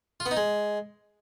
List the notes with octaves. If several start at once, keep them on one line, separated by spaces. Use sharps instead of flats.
F4
B3
D#4
G#3